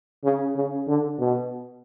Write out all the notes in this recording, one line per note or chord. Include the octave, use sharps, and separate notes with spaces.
C#3
C#3
D3
B2